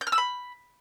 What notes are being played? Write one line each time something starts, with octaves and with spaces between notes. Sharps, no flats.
G6
F6
E6
B5